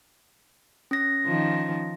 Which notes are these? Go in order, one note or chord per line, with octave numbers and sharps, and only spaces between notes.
C#4 A#6
D#3 F3